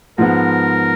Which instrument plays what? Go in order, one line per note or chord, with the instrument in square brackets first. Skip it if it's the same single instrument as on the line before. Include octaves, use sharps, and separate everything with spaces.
[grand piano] G#2 F3 G#3 B3 [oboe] A#4